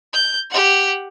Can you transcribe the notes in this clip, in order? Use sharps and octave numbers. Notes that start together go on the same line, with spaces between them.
G6
G4 F#5